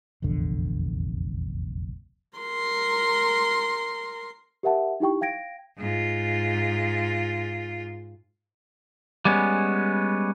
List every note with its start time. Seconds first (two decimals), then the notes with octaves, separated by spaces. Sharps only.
0.22 F1 A#1 E2 D3
2.38 A#4 C6
4.63 G4 A#4 E5 F#5 A5
5.00 D#4 E4 G4 G5 C#6
5.21 F5 G5 G#6 A#6 D7
5.78 G#2 F4
9.25 G3 G#3 B3 C#4